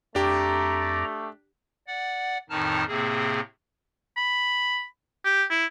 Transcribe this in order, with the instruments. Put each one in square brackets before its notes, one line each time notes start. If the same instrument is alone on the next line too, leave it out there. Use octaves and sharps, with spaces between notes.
[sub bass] F2 [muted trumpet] A3 [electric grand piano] D4 G4 [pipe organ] D5 A#5
[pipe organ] D5 F#5
F2 A2 D#3 D#4 A5 F6
A2 C3 A#3 C4 G#4
[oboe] B5
G4
E4